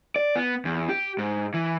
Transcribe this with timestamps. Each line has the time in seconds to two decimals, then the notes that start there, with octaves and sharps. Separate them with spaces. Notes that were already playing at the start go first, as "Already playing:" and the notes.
0.16 D5
0.36 B3
0.65 E2
0.89 G4
1.18 G#2
1.54 E3